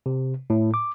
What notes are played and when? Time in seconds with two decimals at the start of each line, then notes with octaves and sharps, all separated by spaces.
0.06 C3
0.50 A2
0.74 D6